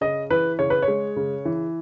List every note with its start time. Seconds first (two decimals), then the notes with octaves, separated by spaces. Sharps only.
0.01 C#3 D#5
0.30 E3 B4
0.59 C#3 C#5
0.70 B4
0.83 C#5
0.88 G#3
1.16 C#3
1.45 E3